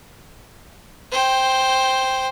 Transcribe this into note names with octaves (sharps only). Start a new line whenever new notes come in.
C5 G5